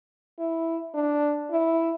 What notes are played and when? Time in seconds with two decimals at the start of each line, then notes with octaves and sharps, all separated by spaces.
0.39 E4
0.94 D4
1.51 E4